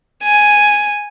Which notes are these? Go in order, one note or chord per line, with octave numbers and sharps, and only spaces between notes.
G#5